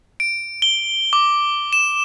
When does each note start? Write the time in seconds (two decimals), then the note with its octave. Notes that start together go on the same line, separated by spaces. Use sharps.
0.20 D7
0.62 G7
1.13 D6
1.73 E7